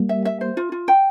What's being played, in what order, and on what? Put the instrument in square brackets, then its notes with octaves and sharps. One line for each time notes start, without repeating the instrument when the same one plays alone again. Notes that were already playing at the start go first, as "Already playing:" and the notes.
Already playing: [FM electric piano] G3 A#3
[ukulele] E5
E5
C5
F4
F4
G5